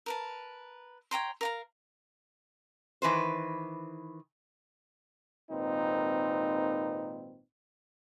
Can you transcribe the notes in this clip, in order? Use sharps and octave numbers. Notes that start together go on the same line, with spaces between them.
A#4 B4 A5
C#5 G5 A#5 C6
A#4 F5 A#5
D#3 E3 B4 C5
G#1 A#2 C4 D#4 B4